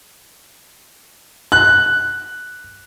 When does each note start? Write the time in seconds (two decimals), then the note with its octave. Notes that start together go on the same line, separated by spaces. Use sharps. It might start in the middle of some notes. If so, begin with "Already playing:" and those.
1.52 F#6